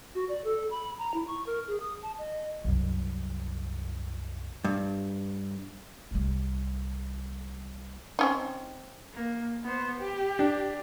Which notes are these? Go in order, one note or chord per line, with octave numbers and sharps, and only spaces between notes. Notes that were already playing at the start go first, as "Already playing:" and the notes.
F#4
D5
A4
B5
A#5
E4
C#6
A#4
G#4
D#6
A5
D#5
C2 F#2
G2
C2 G3
C4 C#4 D#4
A#3
B3 C5
G4
D4